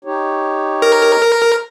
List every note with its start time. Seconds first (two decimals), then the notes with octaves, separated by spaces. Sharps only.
0.05 D#4 G4 C#5
0.82 A#4